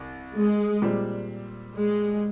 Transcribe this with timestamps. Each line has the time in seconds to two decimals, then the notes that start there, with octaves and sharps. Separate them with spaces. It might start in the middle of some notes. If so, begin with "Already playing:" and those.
Already playing: C2
0.34 G#3
0.82 A#2 G3 C4
1.75 G#3